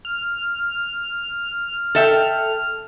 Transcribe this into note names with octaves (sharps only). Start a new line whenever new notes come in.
F6
A4 E5 G5